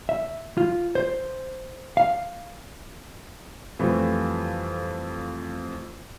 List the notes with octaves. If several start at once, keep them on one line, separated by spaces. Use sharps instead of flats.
E5
F4
C5
F5
F2 E3 F3 G3 A3